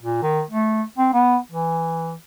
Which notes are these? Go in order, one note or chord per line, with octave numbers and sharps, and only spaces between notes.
A#2
D#3
A3
C4
B3
E3